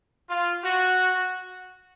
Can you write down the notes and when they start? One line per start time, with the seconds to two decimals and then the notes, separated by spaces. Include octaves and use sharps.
0.29 F4
0.64 F#4